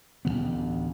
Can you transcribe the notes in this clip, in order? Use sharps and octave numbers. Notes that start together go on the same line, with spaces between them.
A1 D2 D#3 B3